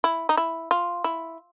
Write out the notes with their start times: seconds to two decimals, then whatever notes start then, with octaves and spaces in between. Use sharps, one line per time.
0.04 E4
0.29 D#4
0.37 E4
0.71 F4
1.04 E4